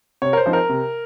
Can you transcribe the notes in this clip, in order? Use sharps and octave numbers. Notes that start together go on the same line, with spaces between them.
C3 C#5
A#4
C5
F3 C4 D#4
A#4
C3